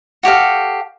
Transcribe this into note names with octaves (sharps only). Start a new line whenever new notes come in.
F#4 G4 A4 F5